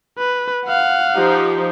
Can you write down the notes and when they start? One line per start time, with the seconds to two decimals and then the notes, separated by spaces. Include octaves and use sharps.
0.18 B4
0.65 F5 F#5
1.15 F3 D#4 G4